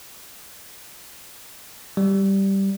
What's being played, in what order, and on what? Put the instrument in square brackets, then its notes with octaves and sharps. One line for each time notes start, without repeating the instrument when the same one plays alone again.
[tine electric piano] G3